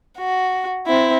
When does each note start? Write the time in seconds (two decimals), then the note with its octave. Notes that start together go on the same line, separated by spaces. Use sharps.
0.18 F#4
0.87 C4 E4